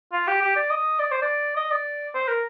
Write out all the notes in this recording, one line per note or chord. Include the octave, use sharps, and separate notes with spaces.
F4
G4
G4
D5
D#5
D5
C5
D5
D#5
D5
C5
A#4